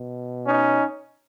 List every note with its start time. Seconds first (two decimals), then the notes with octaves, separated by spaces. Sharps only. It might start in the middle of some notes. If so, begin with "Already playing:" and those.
Already playing: B2
0.46 C#4 D#4